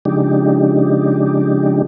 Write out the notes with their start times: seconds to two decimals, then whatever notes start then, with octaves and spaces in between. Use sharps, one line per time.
0.05 C#3 F3 G#3 D4 D#4 G4